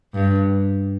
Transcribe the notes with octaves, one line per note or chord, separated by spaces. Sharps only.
G2